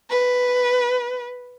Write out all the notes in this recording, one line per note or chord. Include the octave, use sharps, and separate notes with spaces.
B4